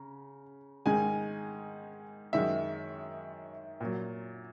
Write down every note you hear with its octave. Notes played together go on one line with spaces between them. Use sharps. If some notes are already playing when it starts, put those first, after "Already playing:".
Already playing: C#3 A#5
G#2 D#3 G#3 G#5
F#2 D#3 G#3 E5
A#2 F#3